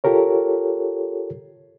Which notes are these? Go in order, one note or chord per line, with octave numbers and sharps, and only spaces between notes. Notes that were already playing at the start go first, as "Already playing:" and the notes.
F4 G4 A4 A#4 C#5